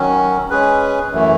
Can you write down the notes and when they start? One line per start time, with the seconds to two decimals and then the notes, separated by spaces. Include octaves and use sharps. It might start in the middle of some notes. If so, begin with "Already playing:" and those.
Already playing: D#3 F#3 C#4
0.50 G#3 C#4 G#4 B4
1.11 F#2 E3 A3